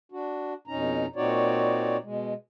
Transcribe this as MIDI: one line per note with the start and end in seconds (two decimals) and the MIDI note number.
0.12 0.54 62
0.12 0.54 66
0.67 1.06 41
0.67 1.06 47
0.67 1.06 61
0.67 1.06 63
0.67 1.06 82
1.16 1.97 46
1.16 1.97 60
1.16 1.97 63
1.16 1.97 66
1.16 1.97 73
1.16 1.97 74
2.03 2.34 47
2.03 2.34 56